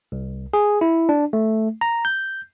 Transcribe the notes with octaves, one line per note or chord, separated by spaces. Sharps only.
C2
G#4
E4
D4
A3
A#5
G6